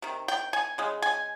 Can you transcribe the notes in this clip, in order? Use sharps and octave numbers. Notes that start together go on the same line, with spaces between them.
C3 D#3
G5
G#5
C#3 G#3
G#5